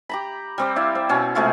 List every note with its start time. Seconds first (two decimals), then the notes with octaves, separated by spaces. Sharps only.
0.09 G4 A#5 B5
0.58 G3 C4 D6
0.76 E4 D5 F5
0.95 C4
1.09 B2 C#4
1.35 C3 G#3 A3 F4